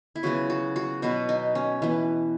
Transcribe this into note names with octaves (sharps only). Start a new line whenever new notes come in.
E4
C#3 F#3 B3 F#4
F#4
F#4
B2 F#3 B3 F#4
D#4
C#4
E3 B3